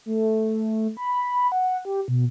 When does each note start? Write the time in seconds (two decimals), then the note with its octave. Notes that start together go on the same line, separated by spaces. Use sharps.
0.06 A3
0.97 B5
1.52 F#5
1.85 G4
2.08 B2